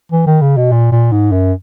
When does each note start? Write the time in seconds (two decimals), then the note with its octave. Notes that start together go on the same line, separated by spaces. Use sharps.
0.12 E3
0.27 D#3
0.42 C#3
0.57 B2
0.72 A#2
0.92 A#2
1.12 G#2
1.32 F#2